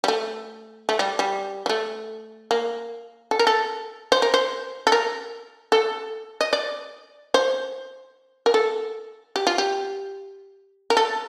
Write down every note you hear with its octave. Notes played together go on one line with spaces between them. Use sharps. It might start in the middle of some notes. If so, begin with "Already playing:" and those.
G3
A3
A3
G3
G3
G3
A3
A#3
A4
A#4
A4
C5
A#4
C5
A4
A#4
A4
D#5
D5
C5
A#4
A4
G4
F4
G4
A#4
A4